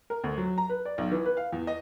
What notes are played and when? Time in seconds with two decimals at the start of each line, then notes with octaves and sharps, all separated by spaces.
0.10 A#4
0.24 D2
0.38 F#3
0.58 A#5
0.70 B4
0.85 D5
0.98 B1
1.12 E3
1.25 B4
1.37 F5
1.53 E2
1.67 D#5